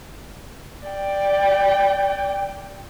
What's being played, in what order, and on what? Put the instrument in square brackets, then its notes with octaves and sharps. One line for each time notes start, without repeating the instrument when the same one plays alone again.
[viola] D5 G5